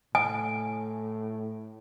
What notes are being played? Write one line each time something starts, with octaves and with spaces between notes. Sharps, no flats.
A2 G#5